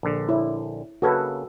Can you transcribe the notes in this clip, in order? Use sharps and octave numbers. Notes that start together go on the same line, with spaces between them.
A#1 D3
E4 C#5
C#3 A#3 C#4 F#4 A4 B4